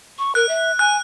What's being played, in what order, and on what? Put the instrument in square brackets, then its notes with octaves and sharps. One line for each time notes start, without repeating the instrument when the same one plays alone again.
[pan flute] C#6
[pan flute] A#4 [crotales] F#6
[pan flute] E5
[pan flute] G#5 [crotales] F#6